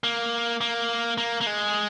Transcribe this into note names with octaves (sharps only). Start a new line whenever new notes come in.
A#3
A#3
A#3
A#3
G#3